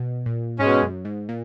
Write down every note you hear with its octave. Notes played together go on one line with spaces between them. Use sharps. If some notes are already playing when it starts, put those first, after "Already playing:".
Already playing: B2
A#2
G#2 B2 G#3 C#4
F#2
G#2
A#2